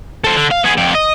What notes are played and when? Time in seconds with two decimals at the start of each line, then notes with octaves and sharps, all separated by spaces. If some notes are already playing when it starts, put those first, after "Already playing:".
0.24 A4 C5
0.36 D3
0.51 F5
0.64 B3 G#4
0.78 F2 G4
0.95 D#5